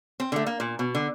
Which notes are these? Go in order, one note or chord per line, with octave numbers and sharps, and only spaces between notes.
C4
D3 A3
A#3
A#2
B2
D3